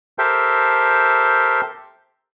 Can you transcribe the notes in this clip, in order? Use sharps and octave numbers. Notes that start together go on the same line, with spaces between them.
G4 A4 A#4 C5 E5 G5